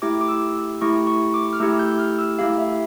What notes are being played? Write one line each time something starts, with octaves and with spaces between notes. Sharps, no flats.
A3 E4 G4 D6
D6
E6
A3 E4 G4 C#6
C#6
D6
F6
A3 E4 G4 E6
G6
F6
E6
A3 E4 G4 F5
E5